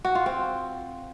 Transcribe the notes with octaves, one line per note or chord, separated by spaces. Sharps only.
F#4
F4
C4